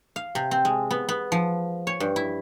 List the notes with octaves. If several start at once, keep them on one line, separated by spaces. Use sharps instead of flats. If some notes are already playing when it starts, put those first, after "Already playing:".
F5
C3
C4
G#3
B3
B3
F3
C#5
G2
E4